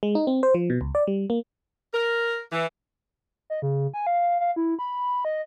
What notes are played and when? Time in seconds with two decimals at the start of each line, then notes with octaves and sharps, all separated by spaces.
0.03 G#3
0.15 D#4
0.27 C4
0.43 C5
0.55 F3
0.70 B2
0.81 C#2
0.95 D5
1.07 G3
1.30 A#3
1.93 A#4
2.51 E3
3.50 D#5
3.62 C#3
3.94 G#5
4.07 F5
4.40 F5
4.56 E4
4.79 B5
5.25 D#5